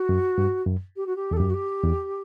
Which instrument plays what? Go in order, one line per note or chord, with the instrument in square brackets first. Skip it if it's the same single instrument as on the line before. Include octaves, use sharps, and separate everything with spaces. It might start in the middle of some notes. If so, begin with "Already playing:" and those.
Already playing: [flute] F#4
[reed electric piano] F#2
G2
F#2
[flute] G4
F#4
G4
[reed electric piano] E2 [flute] A4
[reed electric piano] F#2 [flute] G4
[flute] F#4
G4
[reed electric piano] E2